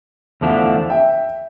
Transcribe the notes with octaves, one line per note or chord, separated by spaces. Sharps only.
E2 D3 F3 A3 D4
E5 G5